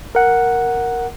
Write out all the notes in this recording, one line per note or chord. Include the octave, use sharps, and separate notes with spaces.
A#4 F#5